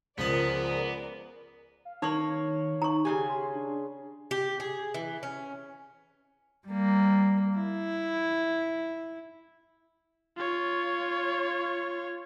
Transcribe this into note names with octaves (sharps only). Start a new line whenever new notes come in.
C#2 F3 G#3 B3 G#4 A#4 D5 A5
F5
D#3 A#3 D#4 C#5 C#6
D#4 A#5 C#6
C#3 A#3 G4 G#5
C6
D4
G4
G#4
E3
C#4
G3 A#3
E4
F4 C#5